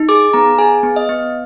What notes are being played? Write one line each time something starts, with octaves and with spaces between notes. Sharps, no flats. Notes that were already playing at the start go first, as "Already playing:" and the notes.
Already playing: D#4
G#4 D6
B3 A#5
G#4 G#5
B3
D#5
B3